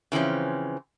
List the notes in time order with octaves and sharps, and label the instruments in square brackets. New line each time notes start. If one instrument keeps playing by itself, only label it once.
[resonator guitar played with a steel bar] C#3 E3 F3 C4 C#4